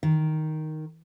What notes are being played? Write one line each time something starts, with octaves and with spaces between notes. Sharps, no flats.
D#3